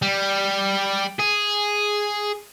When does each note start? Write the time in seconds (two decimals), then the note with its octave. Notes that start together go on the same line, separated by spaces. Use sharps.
0.02 G3
1.19 G#4